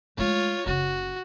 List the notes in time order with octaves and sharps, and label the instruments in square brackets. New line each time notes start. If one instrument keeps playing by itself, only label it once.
[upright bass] G#3 A3 [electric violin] F4 C#5
[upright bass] F#1 C#3 [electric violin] F#4